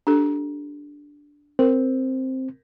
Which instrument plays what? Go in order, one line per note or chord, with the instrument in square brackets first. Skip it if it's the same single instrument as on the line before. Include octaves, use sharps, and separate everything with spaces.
[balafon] D4 G4 A4
[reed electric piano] C4 [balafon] A#4